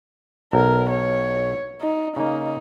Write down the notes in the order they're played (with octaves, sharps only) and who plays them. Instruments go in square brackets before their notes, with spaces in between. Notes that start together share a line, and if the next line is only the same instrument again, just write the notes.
[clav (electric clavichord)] B1 [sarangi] A#4
[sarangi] C#5
D#4
[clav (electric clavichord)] C#3 A#3 [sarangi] D#4